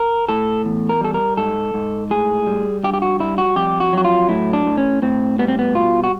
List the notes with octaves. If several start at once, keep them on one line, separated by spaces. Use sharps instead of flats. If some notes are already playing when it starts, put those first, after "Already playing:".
Already playing: A#4
A2 A4
E2
A#4
G3 A4
A#4
G#2 A4
G#2
A2 G#4
G3
G2 G4
G4
F#4
G3 E4
F#4
F2 G4
F#4
F#3 F#4
F4
A2 E4
D4
A2
C#4
A2 C4
G3 B3
C4
B3
B2 F4
F#4